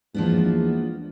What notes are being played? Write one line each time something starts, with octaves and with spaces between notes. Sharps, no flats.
E2 F3 G#3 A#3 B3 D4